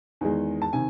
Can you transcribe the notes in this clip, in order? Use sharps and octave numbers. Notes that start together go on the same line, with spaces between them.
E2 D#3 G#3
A5
C3 D#3 G#5